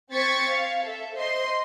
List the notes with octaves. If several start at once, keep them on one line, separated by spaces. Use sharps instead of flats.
C4 C5 C#6 G#6 A6 B6
F5
A4 E5
C5 D#5 C6